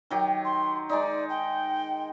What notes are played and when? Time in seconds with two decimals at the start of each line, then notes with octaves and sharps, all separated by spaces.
0.11 D#3 F#3 G4
0.45 C6
0.90 G#3 D#4 D5
1.29 G5